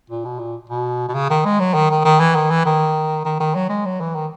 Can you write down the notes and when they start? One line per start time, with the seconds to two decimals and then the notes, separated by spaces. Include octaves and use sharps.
0.10 A#2
0.25 B2
0.39 A#2
0.70 B2
1.08 B2
1.14 C#3
1.30 D#3
1.45 G#3
1.60 F#3
1.74 D#3
1.90 D#3
2.05 D#3
2.20 E3
2.35 D#3
2.50 E3
2.65 D#3
3.25 D#3
3.40 D#3
3.55 F#3
3.69 G#3
3.86 F#3
4.01 E3
4.15 D#3